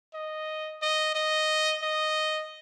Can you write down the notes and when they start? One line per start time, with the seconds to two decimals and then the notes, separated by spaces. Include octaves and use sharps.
0.14 D#5
0.82 D#5
1.15 D#5
1.82 D#5